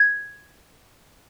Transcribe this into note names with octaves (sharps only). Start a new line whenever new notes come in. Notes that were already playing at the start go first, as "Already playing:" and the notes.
Already playing: G#6